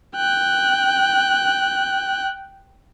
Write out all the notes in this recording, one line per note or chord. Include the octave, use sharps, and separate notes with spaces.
G5 F#6